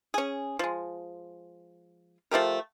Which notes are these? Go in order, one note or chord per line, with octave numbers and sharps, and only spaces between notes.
C#4 G#4
F3 G#3
F3 A3 G4 A#4